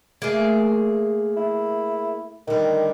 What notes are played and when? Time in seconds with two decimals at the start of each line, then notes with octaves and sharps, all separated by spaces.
0.22 A3 A#3 G#4
1.37 E4
2.48 D3 D#3 G3